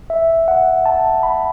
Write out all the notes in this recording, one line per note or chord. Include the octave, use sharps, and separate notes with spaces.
E5
F#5
A5
B5